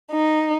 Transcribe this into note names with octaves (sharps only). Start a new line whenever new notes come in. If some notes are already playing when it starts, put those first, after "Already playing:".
D#4